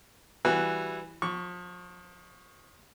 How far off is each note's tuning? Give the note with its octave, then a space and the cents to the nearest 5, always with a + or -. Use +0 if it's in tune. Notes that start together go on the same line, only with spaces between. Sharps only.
E3 +0 G3 +0 F#4 -5
F3 +35 C#6 +0